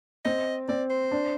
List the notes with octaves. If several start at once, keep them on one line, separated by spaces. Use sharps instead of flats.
C4 D#5
C4 D5
C5
D4